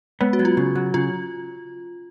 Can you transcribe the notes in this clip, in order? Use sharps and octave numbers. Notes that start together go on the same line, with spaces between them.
G#3 B3
F#4
F#3
F4
C#3
F#3
C#3 F4